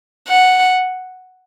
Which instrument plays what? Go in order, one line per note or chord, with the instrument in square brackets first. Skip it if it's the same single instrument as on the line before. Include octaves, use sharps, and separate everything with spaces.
[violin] F#5